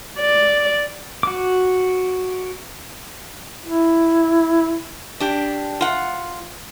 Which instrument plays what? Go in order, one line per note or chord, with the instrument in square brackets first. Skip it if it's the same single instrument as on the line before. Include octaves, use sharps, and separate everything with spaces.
[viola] D5
[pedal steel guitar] F#4 D6
[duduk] E4
[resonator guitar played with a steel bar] D4 G4
F4 F#5